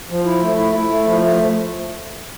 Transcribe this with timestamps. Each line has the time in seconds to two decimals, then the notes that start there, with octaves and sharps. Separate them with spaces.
0.10 F3
0.26 E4
0.42 A3
0.58 E4
0.73 E4
0.89 A3
1.05 F3
1.20 A3